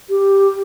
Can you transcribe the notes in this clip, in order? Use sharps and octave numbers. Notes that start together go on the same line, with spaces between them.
G4